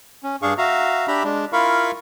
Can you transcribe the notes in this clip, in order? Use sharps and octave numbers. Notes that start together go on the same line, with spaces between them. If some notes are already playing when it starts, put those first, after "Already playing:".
C#4
G2 D4 G#4 F5 C#6
F#4 E5 F5 A#5
D4 G4 E5 A#5 B5
G#3 D4
E4 F4 A#4 F5 B5 C#6